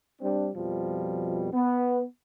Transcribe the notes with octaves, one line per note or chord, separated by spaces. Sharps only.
G3 C4 D4
F2 B2 F3 G3
B3